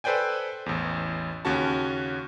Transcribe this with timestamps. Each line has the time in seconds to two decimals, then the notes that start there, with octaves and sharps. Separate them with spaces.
0.04 A4 B4 C5 D5 G5 G#5
0.66 A1 E2
1.45 D#2 C#3 C#4 F#4 A5